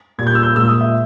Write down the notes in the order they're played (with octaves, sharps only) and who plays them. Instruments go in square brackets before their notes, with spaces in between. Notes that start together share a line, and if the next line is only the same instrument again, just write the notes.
[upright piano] A#2 G3 G#6
G6
E6
G6
A#2 G#3 E6
D#6
E5